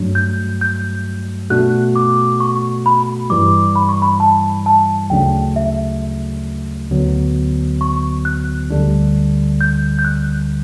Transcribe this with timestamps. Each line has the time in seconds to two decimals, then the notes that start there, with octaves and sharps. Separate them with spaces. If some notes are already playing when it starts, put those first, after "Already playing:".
Already playing: G2 F#3 A3 D4
0.15 G6
0.61 G6
1.50 B2 A3 D4 F#4 F#6
1.96 D6
2.40 C#6
2.86 B5
3.30 G2 E3 G3 D6
3.76 B5
3.89 C#6
4.02 B5
4.20 A5
4.66 A5
5.10 D2 C#3 F#3 A3 D4 G5
5.56 E5
6.90 D2 D3 F#3 B3
7.81 C#6
8.25 F#6
8.70 D2 D3 G3 D4
9.61 G6
9.99 G6
10.05 F#6